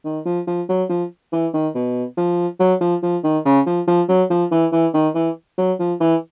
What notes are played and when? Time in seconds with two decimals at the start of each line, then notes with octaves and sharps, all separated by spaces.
0.05 D#3
0.26 F3
0.47 F3
0.69 F#3
0.89 F3
1.33 E3
1.54 D#3
1.75 B2
2.17 F3
2.60 F#3
2.81 F3
3.03 F3
3.24 D#3
3.45 C#3
3.66 F3
3.87 F3
4.09 F#3
4.30 F3
4.51 E3
4.72 E3
4.94 D#3
5.15 E3
5.58 F#3
5.79 F3
6.00 E3